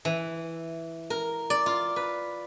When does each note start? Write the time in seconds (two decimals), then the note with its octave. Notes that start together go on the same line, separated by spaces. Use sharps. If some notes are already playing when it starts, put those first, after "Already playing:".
0.05 E3
1.10 A#4
1.50 D5
1.66 F4
1.96 B4